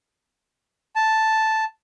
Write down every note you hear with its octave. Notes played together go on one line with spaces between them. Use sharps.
A5